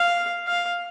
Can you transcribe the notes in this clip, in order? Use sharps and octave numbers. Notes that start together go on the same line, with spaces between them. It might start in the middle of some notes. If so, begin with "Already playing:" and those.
Already playing: F5
F5